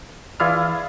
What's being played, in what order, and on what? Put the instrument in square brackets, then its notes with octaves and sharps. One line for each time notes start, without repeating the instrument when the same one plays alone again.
[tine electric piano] E3 D5 F6 [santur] E4 F4 G#4